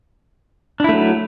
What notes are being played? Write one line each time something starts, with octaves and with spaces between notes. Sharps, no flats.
F#3 A3 D4 E4